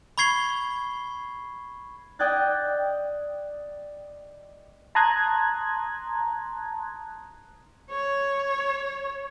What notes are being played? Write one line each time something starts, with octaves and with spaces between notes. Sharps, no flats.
B5 C#6 G#6 C7 G7
D5 D#5 G5 F#6 G#6 A6
A5 A#5 C6 D#6 F#6 G#6
C#5